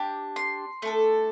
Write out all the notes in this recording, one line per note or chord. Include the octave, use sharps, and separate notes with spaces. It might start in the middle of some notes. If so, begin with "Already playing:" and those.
Already playing: D4 G4
C6
A3 D4 A4